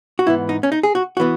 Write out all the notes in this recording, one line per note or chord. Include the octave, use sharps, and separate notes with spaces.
F#4
G#2 E3 B3 E4
D#4
C#4
D#4
G#4
F#4
E3 B3 F#4